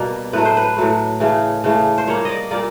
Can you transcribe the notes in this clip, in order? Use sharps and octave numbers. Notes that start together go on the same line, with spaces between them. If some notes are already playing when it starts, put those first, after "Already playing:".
Already playing: B2 G3 A#3
A2 F#3 A3 B4
C5
B4
A2 F#3 A3
C#3 E3 A3
C#3 E3 A3
C5
A#2 G3 A#3 C#5
D5 D#5
A#2 G3 A#3 D5